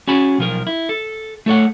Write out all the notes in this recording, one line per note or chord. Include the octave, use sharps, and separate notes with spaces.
C#4 F#4 G#4 A5 B5
B1 F3 A#4
E4
A4
A3 A4 C#5 F#5